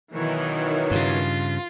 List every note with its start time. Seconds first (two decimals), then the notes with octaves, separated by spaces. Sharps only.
0.15 B2 D#3 E3 F#3 C#5
0.91 G2 C#3 F4